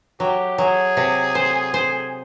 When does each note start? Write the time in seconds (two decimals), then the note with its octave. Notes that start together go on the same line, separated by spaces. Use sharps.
0.20 F#3 G4
0.58 F#3 G#4
0.97 C3
1.35 C5
1.74 C5